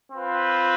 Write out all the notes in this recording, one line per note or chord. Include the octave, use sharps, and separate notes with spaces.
C4 F4 B4